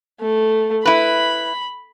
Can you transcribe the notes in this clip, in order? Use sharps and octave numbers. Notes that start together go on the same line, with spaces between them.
A3
E4 B4 B5